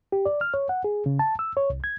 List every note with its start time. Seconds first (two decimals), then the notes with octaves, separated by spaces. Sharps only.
0.12 G4
0.26 D5
0.41 F6
0.54 C#5
0.69 F#5
0.84 G#4
1.06 C#3
1.19 A5
1.39 E6
1.57 C#5
1.70 C2
1.84 G#6